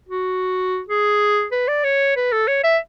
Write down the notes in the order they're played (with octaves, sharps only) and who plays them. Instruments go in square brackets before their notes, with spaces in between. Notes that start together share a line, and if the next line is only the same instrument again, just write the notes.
[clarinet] F#4
G#4
B4
D5
C#5
B4
A4
C#5
E5